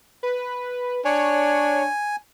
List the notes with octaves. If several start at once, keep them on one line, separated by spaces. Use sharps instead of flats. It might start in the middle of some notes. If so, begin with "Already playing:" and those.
B4
D4 C#5 G#5